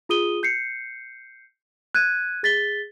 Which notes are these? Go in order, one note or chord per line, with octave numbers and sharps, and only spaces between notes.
F4 G#4 D#6 D#7 G7
G6 C7 C#7
F#6 G#6 D#7
G#4 A6 B6 G7